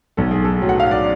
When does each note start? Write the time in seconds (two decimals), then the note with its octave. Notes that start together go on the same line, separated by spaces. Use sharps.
0.17 B1 A4
0.31 G#4
0.45 A4
0.61 A2 F#3
0.69 F#5
0.80 F5
0.91 D5